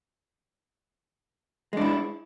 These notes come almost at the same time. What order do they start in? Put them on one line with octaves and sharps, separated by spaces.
G#3 D4 E4